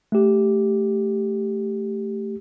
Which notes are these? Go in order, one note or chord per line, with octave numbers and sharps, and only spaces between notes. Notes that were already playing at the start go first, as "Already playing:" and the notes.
A3 G4